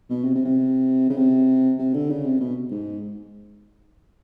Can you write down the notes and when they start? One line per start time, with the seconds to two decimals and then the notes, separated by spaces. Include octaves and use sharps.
0.09 B2
0.24 C3
0.35 C3
0.45 C3
1.10 C#3
1.17 C3
1.78 C3
1.94 D3
2.10 C#3
2.25 C3
2.40 B2
2.71 G#2